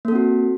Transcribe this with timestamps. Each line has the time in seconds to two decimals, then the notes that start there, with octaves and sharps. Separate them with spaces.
0.05 A#3
0.08 A4
0.12 C4
0.15 F#4